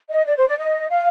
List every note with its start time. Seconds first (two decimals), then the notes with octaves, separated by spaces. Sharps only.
0.10 D#5
0.25 D5
0.36 C5
0.47 D5
0.58 D#5
0.90 F5